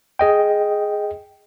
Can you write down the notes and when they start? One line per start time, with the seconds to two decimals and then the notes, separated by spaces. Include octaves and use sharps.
0.19 G#4 D#5 G5